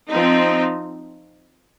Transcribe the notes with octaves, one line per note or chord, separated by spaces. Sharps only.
F3 C4 D#4